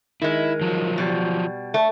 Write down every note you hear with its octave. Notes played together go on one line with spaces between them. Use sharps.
D#3 G#3 E4
F3 F#3
B2 G3
A3